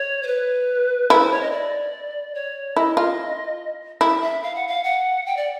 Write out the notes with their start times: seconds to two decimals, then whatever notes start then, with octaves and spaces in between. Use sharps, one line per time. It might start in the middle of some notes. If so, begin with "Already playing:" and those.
Already playing: C#5
0.23 C5
0.27 B4
1.10 E4 B4
1.21 C5
1.31 C#5
1.41 D#5
1.51 D5
2.35 C#5
2.76 E4 D#5
2.97 F4
4.01 E4 E5
4.22 E5
4.43 F5
4.55 F#5
4.67 F5
4.84 F#5
5.26 G5
5.37 D5